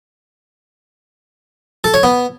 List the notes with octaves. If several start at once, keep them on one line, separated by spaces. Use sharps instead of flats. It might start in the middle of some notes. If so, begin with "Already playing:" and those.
A4
C#5
B3